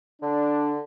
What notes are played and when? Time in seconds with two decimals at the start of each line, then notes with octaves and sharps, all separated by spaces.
0.22 D3 D4